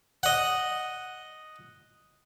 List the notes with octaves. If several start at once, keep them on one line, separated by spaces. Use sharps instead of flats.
D#5 F#5